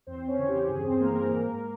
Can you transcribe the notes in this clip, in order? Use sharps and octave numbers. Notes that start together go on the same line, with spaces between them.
E2 C4 C5
C#4 C#5
C#3 E3
G4
G2 G#4
C4 C5
E3 A#3 A#4
A#3 A#4
G#2